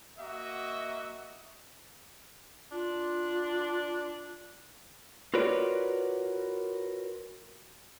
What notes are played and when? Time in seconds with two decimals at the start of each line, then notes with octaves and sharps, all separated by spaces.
0.18 A#3 F#4 D#5 E5
2.72 D4 F4
5.34 F4 F#4 A#4 B4 C#5 D5